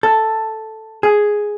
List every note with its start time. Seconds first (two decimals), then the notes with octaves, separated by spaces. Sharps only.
0.03 A4
1.03 G#4